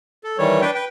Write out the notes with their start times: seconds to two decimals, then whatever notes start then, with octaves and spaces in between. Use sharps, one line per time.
0.24 A4
0.38 D#3 E3 G3 C#5
0.61 D4 B4 G5
0.75 B4 G5